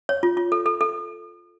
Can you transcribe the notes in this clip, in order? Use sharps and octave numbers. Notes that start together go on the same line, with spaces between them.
C#5
F4
F4
A4
A4
A4